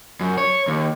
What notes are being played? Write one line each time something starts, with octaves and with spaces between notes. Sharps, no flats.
F#2
C#5
D#2